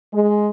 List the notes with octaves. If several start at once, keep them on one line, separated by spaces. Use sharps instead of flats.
G#3